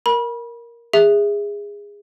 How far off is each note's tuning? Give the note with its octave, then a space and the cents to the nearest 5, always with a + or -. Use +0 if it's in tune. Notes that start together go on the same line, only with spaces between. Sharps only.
A#4 +5 B5 -30
G#4 -20 E5 +0